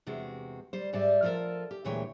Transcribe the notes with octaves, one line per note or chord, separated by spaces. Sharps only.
E2 C3 G#3 F#4
G3 C5
G#2 G3 D5 E5
F3 F4 G4 A4 A#4
G4
D2 A#2 E3 G#3 C#5 G5